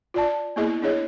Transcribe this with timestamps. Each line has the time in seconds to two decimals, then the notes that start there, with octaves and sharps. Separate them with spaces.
0.14 F4 D5 A5
0.56 A#3 B3 E4 G#4 D#5
0.82 D4 E4 G#4 C#5 D#5